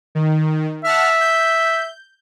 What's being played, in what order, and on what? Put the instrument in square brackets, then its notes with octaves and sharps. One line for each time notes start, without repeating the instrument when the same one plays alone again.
[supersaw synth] D#3
[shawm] E5 [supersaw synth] F#5 A5 F6
[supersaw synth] G6